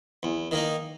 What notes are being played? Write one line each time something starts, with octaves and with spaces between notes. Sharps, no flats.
E2
D#3 A#3 D#4